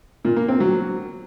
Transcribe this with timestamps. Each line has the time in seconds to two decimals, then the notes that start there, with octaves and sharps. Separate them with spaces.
0.25 A#2
0.36 A#3
0.48 C4
0.60 F#3